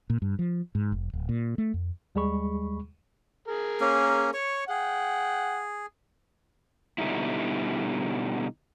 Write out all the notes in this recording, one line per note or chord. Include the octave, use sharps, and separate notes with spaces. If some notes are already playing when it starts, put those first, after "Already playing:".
A#2
G2
F3
G#2
F1
D1
A#2
A3
F2
D#2 G3 G#3 G#4 B5 C#6
G#4 A#4
A#3 C#4
C#5 C#6
G#4 F#5 G5
B2 D3 G3 D#4 E4